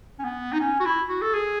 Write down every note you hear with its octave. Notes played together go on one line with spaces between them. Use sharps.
C#4
B3
D#4
C#4
F#4
E4
F#4
A4
G#4